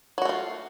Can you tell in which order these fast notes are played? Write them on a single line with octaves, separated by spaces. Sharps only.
F#3 F#4 A3 F4